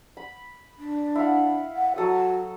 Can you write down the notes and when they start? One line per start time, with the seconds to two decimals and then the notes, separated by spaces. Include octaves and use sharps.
0.17 B5
0.79 D4
1.15 E4 F5 F#5
1.76 F#5
1.96 F#3 F#4 A4 D#6